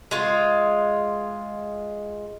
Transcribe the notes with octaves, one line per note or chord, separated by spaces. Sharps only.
G#3 F4